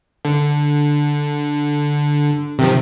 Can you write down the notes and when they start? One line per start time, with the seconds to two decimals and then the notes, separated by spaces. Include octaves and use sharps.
0.25 D3
2.59 C3 D#3 F3